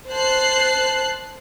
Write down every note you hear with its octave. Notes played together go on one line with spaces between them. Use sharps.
C5 A5 F#6 C7